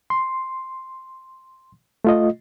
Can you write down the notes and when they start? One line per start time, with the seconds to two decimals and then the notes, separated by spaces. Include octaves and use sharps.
0.10 C6
2.05 A3 F4 D#5